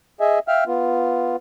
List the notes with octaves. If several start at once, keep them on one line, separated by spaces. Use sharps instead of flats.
G#4 D#5 E5 G#5
E5 F5 G5 F6
B3 F4